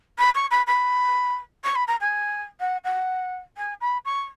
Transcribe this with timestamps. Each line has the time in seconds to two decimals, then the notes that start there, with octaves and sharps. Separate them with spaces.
0.18 B5
0.35 C#6
0.51 B5
0.66 B5
1.64 C#6
1.75 B5
1.87 A#5
2.00 G#5
2.60 F#5
2.84 F#5
3.57 G#5
3.81 B5
4.05 C#6